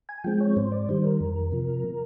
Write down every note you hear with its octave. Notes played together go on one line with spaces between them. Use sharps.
G#5
F3 G#3 C4 G5
C#5
G#2 C5
D5
D#3 G3 C5
A#4
F2
C3 F3